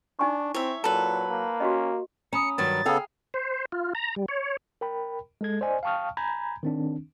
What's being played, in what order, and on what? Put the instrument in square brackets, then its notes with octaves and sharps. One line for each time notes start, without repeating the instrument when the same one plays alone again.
[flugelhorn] D4 [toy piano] D#4 G#5 C#6
[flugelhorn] C4 [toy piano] E4 [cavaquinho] C#5 E5
[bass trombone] A#2 [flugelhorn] F#3 [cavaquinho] A4 B4
[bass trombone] A#3
[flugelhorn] C#4 [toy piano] F#4 G4 D#5
[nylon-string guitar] C#4 [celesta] A#5 B5 D#6 [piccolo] C#7
[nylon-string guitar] G2 D#3 F#3 [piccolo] A6
[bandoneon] C#3 B3 A4 [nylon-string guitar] G#4 F5 G5
[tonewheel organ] C5
F4
A#5
G3
C#5
[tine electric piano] A#4 G5 B5
G#3 A4 G#6
C5 D5 D#5 G#5
F5 G5 A5 C#6 D#6 F6
G#5 A#5 B5 G6 G#6
D#3 C4 D4